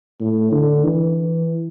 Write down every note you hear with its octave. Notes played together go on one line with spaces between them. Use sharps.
A2
D3
E3